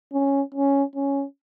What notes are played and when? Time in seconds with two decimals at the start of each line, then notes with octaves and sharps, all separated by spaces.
0.13 C#4
0.55 C#4
0.96 C#4